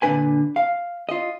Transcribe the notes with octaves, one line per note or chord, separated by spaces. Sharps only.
A#2 D3 E3 D4 B4 G#5
F5
F4 D#5